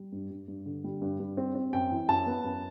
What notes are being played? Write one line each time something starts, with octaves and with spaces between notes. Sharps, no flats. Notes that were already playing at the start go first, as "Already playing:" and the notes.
Already playing: G3
G2
G2
G2
D3
G3
G2
G2
C4
C4
F#2 G5
E3
F#2 A5
B3
F#2